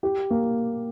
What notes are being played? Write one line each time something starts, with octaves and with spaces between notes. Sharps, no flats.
G4
A#3